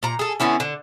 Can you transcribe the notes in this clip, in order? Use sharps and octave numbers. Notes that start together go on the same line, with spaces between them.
A#2 A#5
G#4 A4
D3 B3 C#4 E4
D3